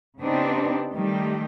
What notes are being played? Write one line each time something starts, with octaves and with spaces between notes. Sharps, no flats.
C#3 B3 C4 D4 D#4 G4
D#3 G3 A3 G4